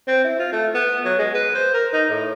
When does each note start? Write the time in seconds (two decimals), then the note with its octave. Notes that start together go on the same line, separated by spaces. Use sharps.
0.08 C4
0.24 E4
0.39 F4
0.52 A3
0.74 B3
1.05 F#3
1.19 G#3
1.34 B4
1.55 C5
1.74 A#4
1.93 D#4
2.09 A2